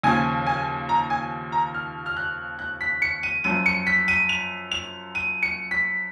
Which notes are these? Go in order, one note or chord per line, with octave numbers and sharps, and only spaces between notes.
D#2 C#3 F3 G#5
G#5
A#5
G#5
A#5
F6
F6
F#6
F#6
B6
C#7
D#7
F#2 F3 D#7
C#7
B6
D#7
F7
F7
D#7
C#7
B6